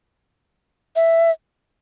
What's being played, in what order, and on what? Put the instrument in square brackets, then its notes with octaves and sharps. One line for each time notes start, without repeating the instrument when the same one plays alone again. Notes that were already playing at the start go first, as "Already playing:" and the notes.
[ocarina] E5